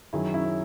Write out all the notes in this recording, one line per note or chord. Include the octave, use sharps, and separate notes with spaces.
F#2 D#3 F#3 E4 G#4
C#4 E4
C#4